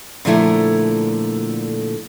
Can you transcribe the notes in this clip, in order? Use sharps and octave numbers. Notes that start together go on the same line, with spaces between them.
A#2 D3 F3 A3 E4 A#4